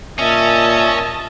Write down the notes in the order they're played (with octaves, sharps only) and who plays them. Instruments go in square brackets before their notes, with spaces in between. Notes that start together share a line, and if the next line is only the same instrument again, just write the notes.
[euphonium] A#2 [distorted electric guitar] C#4 [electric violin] D#5 A5 [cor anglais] E5